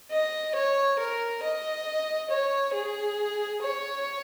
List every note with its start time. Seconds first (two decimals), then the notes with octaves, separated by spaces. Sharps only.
0.11 D#5
0.55 C#5
0.99 A#4
1.43 D#5
2.30 C#5
2.73 G#4
3.61 C#5